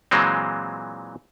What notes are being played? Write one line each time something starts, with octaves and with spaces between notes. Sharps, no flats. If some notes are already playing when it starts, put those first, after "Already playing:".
A#2 E3 F#3 G#3 C4